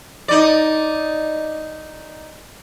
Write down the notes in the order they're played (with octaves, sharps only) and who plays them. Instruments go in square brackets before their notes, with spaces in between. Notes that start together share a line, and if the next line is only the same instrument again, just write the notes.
[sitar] D#4 D5